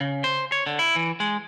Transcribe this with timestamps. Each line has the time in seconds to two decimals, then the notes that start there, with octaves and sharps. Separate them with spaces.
0.01 C#3
0.24 C5
0.52 C#5
0.67 D3
0.79 E4
0.96 E3
1.20 G#3